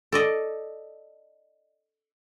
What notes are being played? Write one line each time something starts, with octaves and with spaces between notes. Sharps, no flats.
A4 D5 D#5